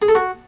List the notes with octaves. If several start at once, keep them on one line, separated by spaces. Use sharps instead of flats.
G#4
A4
F#4